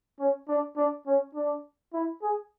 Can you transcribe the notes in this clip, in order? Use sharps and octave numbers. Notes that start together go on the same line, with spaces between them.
C#4
D4
D4
C#4
D4
E4
G#4